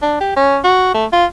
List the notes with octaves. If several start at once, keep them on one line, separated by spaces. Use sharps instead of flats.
D4
G4
C#4
F#4
A3
F4